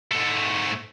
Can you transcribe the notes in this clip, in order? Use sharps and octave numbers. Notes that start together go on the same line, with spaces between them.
G#2 A3